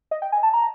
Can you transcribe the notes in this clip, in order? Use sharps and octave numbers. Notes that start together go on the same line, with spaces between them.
D#5
G5
G#5
A5
A#5